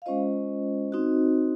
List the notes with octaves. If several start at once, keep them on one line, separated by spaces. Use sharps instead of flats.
F5
G#3 C#4 F4 C5 D#5
C4 D#4 F#4